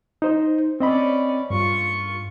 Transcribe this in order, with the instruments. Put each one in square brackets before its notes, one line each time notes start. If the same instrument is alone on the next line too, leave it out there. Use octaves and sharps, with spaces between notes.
[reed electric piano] D#4 C5
[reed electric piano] C4 D#5 B5 [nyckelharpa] C#4 D5
[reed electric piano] G2 [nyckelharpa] F4 C#6